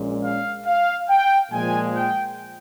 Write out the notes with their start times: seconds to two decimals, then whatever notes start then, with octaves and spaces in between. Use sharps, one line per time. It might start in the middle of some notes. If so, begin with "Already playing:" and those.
Already playing: A#1 A#2 G#3 C#4
0.23 F5
0.66 F5
1.09 G5
1.51 A#2 F3 G#3 G#5
1.94 G5